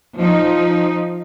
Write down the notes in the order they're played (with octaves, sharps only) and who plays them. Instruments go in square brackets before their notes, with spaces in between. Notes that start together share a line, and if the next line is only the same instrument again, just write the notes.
[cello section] F3 D#4